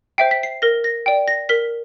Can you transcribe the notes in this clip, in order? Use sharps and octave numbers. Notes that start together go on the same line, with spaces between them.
C5 E5 G5 C7
B6
C7
A#4 A#6
A#6
D5 G5
A#6
A#4 B6